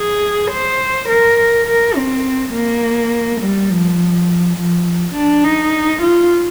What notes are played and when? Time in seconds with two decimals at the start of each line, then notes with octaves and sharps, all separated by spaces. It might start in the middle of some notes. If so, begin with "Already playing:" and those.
Already playing: G#4
0.51 C5
1.09 A#4
1.67 A#4
1.97 C4
2.54 A#3
3.41 G3
3.70 F3
4.57 F3
5.15 D4
5.44 D#4
6.02 F4